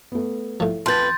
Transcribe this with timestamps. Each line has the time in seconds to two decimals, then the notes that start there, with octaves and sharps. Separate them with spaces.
0.12 A3 B3
0.60 A2 F3
0.86 F2 B4 A5 C6 G6 A6